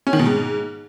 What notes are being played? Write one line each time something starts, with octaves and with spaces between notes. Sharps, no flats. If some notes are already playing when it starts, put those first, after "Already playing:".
C#4
D#3
B2
G#2